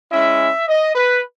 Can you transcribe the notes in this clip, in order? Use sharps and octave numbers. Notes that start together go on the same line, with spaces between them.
G#3 C#4 E4 E5
D#5
B4